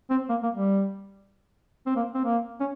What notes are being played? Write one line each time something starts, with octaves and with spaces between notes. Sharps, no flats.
C4
A#3
A#3
G3
C4
A#3
C4
A#3
C#4